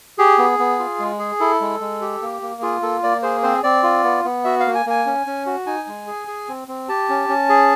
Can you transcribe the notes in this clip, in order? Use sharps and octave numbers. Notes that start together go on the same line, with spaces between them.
G4 G#4
B3
B3
F4
G#3
G#4
E4 A4
G#3
G#3
G4
A#3
A#3
F4 G#4
A#3 A4
A#3 D5
G#4 C5
C4 C5
C4 D5
F4
B3
B3
F#4 E5
F5
A#3
G#5
A#3 G#5
C#4
C#4
F#4
D#4 G#5
G#3
G#4
G#4
C4
C4
G4 A5
C#4
C#4
G#4